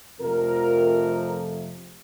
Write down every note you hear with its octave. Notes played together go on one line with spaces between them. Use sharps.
F2 C3 F3 A3 A#4